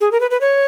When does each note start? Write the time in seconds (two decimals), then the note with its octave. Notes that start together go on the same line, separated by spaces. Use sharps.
0.01 G#4
0.12 A#4
0.20 B4
0.31 B4
0.41 C#5